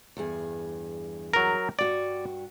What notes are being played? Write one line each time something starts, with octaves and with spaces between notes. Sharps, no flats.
E2 G2 G#4
F#3 A#4
G2 F#4 D5 G5